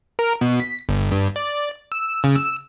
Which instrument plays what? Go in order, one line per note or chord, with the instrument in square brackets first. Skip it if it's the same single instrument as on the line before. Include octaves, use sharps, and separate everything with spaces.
[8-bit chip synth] A#4
B2
B6
G1
G2
D5
E6
C#3
E6